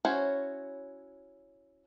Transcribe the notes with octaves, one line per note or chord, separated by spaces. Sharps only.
C#4 E4 F#4 C5 C#5